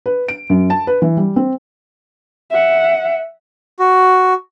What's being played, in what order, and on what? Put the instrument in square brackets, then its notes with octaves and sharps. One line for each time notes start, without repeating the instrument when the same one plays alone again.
[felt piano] B4
D7
F#2
A5
B4
E3
G3
C4
[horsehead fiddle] E5 F#5
[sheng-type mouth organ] F#4